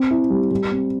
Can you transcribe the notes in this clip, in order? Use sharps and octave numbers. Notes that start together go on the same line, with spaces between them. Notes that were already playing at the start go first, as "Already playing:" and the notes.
Already playing: C4
E4
G3
G3
C4